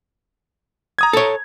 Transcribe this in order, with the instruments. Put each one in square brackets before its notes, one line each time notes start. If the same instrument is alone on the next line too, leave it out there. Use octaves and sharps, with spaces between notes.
[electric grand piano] A#5 D#6 G#6
[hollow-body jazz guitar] A4 C#5